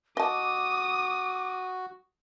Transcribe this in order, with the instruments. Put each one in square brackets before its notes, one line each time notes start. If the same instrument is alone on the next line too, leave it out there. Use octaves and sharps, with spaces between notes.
[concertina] F#4 [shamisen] D#5 A5 [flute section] D6 [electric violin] D#6